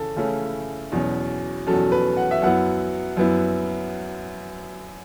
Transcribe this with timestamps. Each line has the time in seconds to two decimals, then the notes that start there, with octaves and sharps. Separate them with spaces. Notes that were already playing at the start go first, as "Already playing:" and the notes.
Already playing: C#3 E3 C#4 A4
0.16 C#3 E3 A3 C#4 E4
0.92 E2 B2 F#3 C#4
1.67 E2 B2 F#3 C#4 A4
1.92 B4
2.17 F#5
2.31 E5
2.42 F#2 F#3 B3 E4 F#5
3.17 F#2 F#3 B3 E4